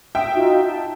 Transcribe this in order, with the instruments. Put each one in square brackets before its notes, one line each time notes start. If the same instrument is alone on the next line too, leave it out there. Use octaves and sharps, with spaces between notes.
[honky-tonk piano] E5 G5 [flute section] D#6
[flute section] D#4 F4 F#4
A5